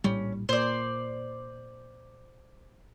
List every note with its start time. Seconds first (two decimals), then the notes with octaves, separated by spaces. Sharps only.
0.04 A#1 A2 G3 C#4
0.49 A#2 C5 D5